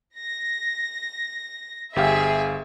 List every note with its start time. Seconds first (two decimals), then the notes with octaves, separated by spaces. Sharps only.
0.17 A#6
1.96 G1 G4 G#4 E5 F5